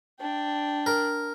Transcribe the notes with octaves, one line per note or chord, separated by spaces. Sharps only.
D4 G5
A#4